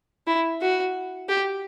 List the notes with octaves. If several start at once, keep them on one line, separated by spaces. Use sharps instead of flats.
E4
F#4
G4